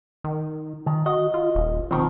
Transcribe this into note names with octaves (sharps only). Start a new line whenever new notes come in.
D#3
D#3
F#4 D#5
F4
D#1
B2 D#3 F3 C4